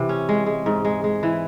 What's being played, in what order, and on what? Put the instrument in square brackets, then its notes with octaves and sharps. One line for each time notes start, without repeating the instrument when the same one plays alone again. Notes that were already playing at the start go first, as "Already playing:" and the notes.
Already playing: [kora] C3 E3
C#4
G#3
G#3
G#2
G#3
G#3
E3